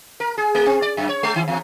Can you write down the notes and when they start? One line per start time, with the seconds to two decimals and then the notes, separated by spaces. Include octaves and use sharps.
0.20 A#4
0.38 G#4
0.55 A3
0.66 C4
0.82 D5
0.97 F#2
1.09 C#5
1.23 G#3
1.36 D#3
1.48 E2